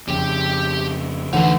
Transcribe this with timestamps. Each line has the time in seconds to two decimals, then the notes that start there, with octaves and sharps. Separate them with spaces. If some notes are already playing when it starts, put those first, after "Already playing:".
0.09 F2 C#3 G4 G5
1.33 D2 D3 E3 A3 D#4 F#5